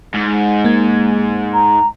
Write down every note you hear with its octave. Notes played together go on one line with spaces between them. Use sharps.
G#2 G#3
A#3 G#6
A#5